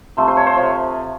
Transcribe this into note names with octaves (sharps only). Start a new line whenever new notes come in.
C3 F3 A3 C5
C5
C#5
C5
C3 F3 A3 C#5